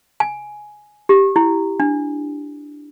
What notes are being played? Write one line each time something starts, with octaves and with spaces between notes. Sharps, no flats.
G#5
G4
E4
D4